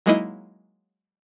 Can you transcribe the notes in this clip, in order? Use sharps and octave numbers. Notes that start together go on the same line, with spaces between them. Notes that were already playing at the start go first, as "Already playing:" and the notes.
F#3 G#3 A#3 D#4 E4 D#5